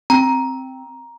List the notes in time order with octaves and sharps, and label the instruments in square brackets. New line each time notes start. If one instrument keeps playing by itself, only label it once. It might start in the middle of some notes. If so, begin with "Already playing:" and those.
[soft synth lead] C4 [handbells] A#5